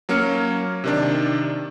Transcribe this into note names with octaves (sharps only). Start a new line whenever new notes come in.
F#3 A#3 C#4 F6 C#7
C3 D#3 D4